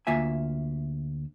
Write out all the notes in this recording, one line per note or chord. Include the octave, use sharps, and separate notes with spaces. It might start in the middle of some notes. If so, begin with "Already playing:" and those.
D2 A#3 F4 E5 G#5